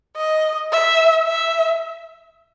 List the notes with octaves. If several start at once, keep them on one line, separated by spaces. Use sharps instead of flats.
D#5
E5
E5